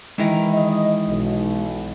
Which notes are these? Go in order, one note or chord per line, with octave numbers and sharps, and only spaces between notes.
D#3 E3 G#3 A#5
D#5
B1